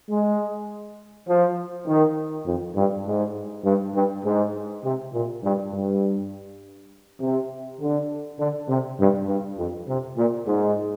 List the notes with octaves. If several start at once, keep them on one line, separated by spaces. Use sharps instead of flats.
G#3
F3
D#3
F2
G2
G#2
G2
G2
G#2
C3
A#2
G2
G2
C3
D3
D3
C3
G2
G2
F2
C3
A#2
G#2